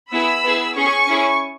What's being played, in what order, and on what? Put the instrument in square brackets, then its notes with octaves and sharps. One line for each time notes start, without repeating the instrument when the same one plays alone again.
[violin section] B3 E4 G#4 B5 E6
B3 E4 G#4
C#4 G#4 G#5 C#6
C#4 E4 G#4